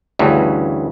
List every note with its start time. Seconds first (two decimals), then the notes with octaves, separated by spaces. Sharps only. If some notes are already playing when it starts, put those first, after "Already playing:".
0.19 D2 G2 C#3 E3